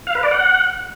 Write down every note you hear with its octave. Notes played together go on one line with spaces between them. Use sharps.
F5
B4
D5
F#5